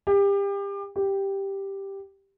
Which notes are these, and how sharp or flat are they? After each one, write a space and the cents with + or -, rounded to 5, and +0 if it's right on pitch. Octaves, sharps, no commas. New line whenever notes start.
G4 +30
G4 +0